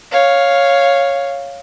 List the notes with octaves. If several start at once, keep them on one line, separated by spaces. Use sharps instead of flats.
C#5 F5